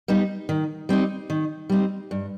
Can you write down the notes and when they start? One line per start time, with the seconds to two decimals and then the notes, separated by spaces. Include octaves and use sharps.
0.08 G3 B3 D#4
0.49 D#3
0.89 G3 C4 D#4
1.30 D#3
1.69 G3 C4 D#4
2.11 G2